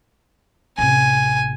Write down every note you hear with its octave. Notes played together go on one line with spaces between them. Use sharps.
A1 C3 G#5